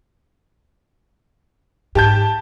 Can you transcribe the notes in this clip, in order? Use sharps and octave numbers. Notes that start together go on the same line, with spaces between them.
G#2 G4 A5 G6